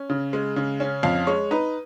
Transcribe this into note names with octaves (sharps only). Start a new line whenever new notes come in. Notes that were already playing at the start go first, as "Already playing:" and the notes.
Already playing: C#4
C#3
G#3
C#3
C#4
F2 F5
G#3 C#5
D#4 B4